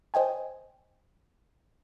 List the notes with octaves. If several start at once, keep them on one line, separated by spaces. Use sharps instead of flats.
C5 D#5 G5 G#5